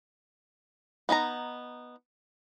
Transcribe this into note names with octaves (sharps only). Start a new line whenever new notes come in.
B3 D#4 G#5 A#5